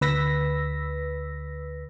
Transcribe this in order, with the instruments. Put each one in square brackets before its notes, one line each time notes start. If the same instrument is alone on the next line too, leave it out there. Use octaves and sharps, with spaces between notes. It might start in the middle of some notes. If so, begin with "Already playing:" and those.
[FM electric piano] D2 B4 E6 A#6 B6